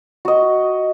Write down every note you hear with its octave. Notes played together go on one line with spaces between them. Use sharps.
F#4 D#5